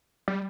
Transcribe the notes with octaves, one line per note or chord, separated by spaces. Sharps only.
G3